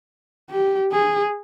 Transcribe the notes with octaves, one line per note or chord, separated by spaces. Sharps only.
G4
G#4